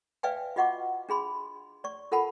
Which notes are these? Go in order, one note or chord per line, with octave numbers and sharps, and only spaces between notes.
B4 D5 E5 F5 G5 G#5
F4 F#4 D#5 F#5 C#6 D6
D4 G#4 B5 C6
D5 C#6
F4 A4 A#4 F#5 A5 B5